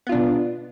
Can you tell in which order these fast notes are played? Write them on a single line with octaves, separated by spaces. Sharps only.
B3 F4 D4 B2